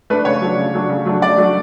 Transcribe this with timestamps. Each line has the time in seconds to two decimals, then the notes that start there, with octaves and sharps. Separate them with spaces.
0.10 A3 D4 B4
0.25 C#3 C#5
0.41 F#3 A3 D4
0.57 C#3
0.74 F#3 A3 D4
0.89 C#3
1.05 F#3 A3 D4
1.21 C#3 D5
1.37 F#3 A3 D4